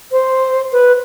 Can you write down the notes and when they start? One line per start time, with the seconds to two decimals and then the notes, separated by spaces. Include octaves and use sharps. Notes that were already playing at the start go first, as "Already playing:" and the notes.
0.12 C5
0.73 B4